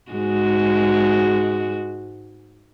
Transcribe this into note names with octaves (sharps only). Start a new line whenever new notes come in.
G#2 G#3 F#4